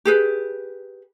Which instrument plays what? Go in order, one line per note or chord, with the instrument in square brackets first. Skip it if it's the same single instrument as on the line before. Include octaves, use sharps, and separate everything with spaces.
[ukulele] G4 G#4 B4